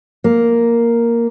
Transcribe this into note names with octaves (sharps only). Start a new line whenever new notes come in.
A#3